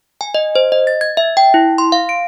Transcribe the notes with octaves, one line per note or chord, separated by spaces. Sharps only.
G#5
D#5
C5
D#5
A6
G#6
E5
G5
E4
C6
F5
D7